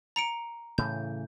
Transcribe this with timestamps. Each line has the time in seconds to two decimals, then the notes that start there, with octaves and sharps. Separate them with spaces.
0.16 A#5 C#7 D7
0.78 A2 C#3 E3 G6